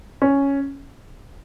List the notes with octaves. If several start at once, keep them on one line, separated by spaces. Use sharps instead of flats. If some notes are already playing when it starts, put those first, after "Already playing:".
C#4